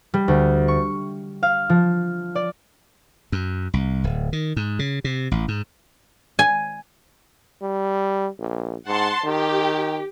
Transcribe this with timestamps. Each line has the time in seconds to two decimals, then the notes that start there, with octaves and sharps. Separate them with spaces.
0.14 G3
0.28 D2
0.68 C#6
1.43 F5
1.69 F3
2.35 D5
3.32 F#2
3.74 C2
4.04 D1
4.33 D#3
4.56 G#2
4.79 C#3
5.04 C3
5.31 A1
5.48 G#2
6.39 G#5
7.62 G3
8.40 A#1
8.87 G#2 F#5 A5 C6
9.25 D#3 G4